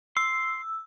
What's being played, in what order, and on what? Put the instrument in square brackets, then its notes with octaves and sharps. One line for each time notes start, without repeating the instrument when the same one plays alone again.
[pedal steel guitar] C6 [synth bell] E6